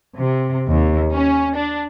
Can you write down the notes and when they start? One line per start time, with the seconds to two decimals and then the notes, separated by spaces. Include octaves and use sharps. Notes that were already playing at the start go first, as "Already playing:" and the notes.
0.17 C3
0.67 D#2
1.12 C#4
1.56 D4